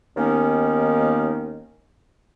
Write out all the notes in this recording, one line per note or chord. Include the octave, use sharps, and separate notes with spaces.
D#2 D#3 A#3 B3 C#4